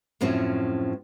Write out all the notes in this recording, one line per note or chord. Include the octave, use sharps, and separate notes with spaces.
F#2 A2 F3 C4 C#4 F#4